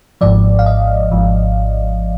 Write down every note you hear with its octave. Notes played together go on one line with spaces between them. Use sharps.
G#1 G#2 F3 D5
F5
D#5
G#1 G#2 F3